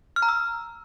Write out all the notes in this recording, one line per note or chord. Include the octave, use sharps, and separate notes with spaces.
F6
A#5
E6